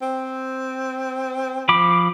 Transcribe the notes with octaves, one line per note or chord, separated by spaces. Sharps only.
C4
F3 B5 D6